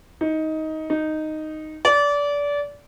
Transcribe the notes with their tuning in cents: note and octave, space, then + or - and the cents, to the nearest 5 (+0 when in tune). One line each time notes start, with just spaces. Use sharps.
D#4 +15
D#4 -5
D5 -25